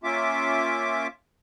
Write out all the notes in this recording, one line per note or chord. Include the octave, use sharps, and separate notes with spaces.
A#3 C#4 F4 E5 D6